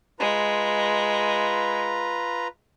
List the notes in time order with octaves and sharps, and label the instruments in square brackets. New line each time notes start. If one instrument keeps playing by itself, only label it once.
[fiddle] G#3 [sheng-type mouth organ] F4 B4 A#5